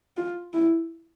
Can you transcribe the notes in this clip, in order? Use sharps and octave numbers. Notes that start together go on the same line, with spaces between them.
F4
E4